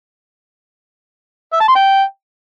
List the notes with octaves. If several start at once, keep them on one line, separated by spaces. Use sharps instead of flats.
E5
A5
C6
G5